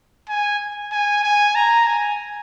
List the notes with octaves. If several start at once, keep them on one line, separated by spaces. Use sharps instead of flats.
G#5
G#5
G#5
A#5
G#5